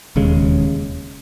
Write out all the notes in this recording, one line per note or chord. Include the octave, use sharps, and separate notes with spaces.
E1 D#2 C#3 G#3